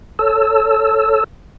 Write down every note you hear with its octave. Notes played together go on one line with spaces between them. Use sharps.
A4 C#5 A5 E6